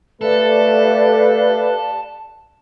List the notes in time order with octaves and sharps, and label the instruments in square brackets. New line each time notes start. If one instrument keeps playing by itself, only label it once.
[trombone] A3 [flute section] G4 D5 F5 [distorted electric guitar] A4 [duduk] B4